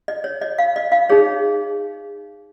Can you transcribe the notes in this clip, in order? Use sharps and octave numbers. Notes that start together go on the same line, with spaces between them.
D#5
C#5
D#5
F5
D#5
F5
D#4 G#4 C#5